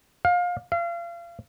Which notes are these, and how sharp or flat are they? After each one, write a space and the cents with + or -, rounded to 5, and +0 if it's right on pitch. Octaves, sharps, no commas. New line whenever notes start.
F5 +25
F5 -35